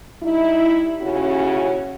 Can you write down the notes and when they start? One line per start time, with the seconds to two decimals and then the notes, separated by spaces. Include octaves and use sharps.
0.23 G3 D#4 E4
1.00 D#2 C#3 C#4 E4 F#4